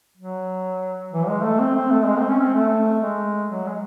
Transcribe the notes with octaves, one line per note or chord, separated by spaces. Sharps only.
F#3
E3
G#3
A3
C4
C4
A3
G#3
C4
C#4
C4
A3
G#3
F#3
G#3